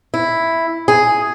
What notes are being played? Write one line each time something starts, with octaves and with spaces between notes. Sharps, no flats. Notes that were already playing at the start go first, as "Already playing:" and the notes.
E4
G#4